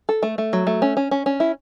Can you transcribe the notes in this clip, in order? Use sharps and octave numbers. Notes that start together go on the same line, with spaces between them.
A4
A3
A3
F#3
A3
C#4
C#4
C#4
C#4
E4